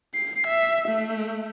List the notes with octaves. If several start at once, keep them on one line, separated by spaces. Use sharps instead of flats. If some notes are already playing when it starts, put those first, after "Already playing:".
C7
E5
A3